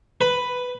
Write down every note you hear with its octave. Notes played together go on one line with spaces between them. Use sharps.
B4